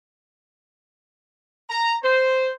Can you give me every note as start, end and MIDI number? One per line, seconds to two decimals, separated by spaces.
1.70 1.96 82
2.03 2.50 72